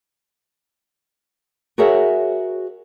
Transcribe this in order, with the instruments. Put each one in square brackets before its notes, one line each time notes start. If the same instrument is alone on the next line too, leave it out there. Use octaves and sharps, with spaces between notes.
[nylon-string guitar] F#4 G#4 A#4 C#5 E5 F#5